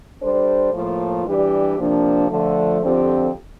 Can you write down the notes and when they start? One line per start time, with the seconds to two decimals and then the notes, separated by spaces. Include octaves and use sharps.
0.21 G3 D4 A4 C5
0.73 A2 F3 A#3 F4
1.25 E3 G3 D4 G4 D5
1.78 C3 F3 A#3 D4
2.30 D3 F3 A3
2.82 F2 D3 F3 C4 G4